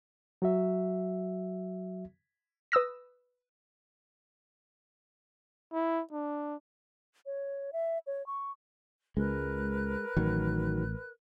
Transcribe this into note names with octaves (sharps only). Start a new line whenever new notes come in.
F#3 F#4 E5
B4 D#6 E6 A#6
E4
D4
C#5
E5
C#5
C#6
C#2 G#3 A#4 B4 F#6
A1 D#3 F#3